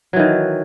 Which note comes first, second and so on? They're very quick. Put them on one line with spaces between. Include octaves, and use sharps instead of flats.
F#3 E3 D#3